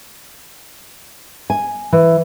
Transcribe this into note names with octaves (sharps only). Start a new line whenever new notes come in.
G#5
E3